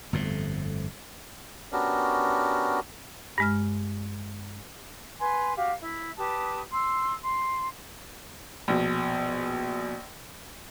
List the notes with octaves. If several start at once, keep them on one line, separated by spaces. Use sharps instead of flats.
G1 F2 A2
B3 C#4 D4 F#4 G4 A#4
G2 G#3 F6
B4 G#5 C6
F#4 G4 F5
E4
G4 B4 A5 D#6
C6 E6
C6
A#1 B2